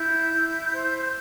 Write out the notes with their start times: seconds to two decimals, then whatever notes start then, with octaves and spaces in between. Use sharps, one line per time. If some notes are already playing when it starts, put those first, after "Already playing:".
Already playing: E4 G6
0.33 E4
0.72 C5